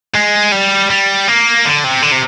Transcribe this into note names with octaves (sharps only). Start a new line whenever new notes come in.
G#3
G3
G3
A#3
D3
C3
D3
C3